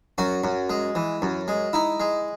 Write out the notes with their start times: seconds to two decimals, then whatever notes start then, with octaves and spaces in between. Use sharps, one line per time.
0.18 F#2 F#4
0.44 F#2
0.70 G#3
0.95 E3
1.22 F#2
1.48 G#3
1.73 D#4 E4
2.00 G#3